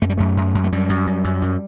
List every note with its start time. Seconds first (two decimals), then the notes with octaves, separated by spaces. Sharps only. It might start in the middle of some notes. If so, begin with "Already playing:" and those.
0.02 F#2 A3
0.09 G3
0.17 F#2 A3
0.37 F#2
0.55 F#2
0.64 A3
0.72 F#2 G3
0.89 F#2
1.07 F#2
1.24 F#2
1.42 F#2